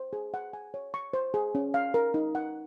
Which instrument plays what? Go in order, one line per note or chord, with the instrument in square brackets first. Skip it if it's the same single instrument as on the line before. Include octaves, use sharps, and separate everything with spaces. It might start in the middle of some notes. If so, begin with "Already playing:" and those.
Already playing: [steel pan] C5
G#4
F#5
G#5
C#5
C#6
C5
G#4
C#4
F5
A#4
D#4
F#5